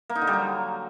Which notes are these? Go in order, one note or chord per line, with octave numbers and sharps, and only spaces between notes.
A#3
D#4
D3
G3
F#3